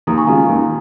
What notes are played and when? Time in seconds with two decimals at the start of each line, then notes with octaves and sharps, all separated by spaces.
0.07 D#2 A#5 D#6
0.17 G#5 C#6
0.27 C#3 G#3 F4 F5 A#5
0.49 D#2